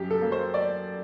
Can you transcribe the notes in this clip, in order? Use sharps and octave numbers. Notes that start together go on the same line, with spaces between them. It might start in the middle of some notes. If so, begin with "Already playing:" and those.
Already playing: F#2 G4
A4
F#3 A#3
C5
D5